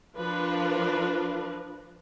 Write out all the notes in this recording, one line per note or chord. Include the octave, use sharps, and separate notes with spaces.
F3 D4 F4 A#4 B4